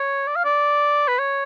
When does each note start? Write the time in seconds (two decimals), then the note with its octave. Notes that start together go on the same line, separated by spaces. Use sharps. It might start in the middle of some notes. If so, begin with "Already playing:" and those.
Already playing: C#5
0.27 D5
0.36 F5
0.44 D5
1.08 B4
1.19 C#5